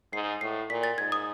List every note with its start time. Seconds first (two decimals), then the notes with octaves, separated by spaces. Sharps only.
0.13 G#2 C7
0.41 A2 C7
0.70 A#2 B6
0.83 A6
0.98 G#2 G#6
1.12 D#6